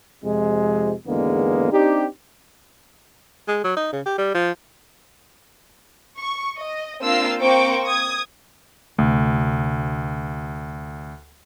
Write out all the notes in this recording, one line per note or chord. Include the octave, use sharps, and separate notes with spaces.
F2 C3 G#3
G#1 E2 D3 G#3 A#3 B3
C4 D4 D#4 G4
G#3
F#3
D#4
C#3
G4
G3
F3
C#6
D#5
A#3 C4 D4 F4 E6 C7
A#3 C4 C5 G5 C#6 D6
D#6 G#6
D2 C3 A3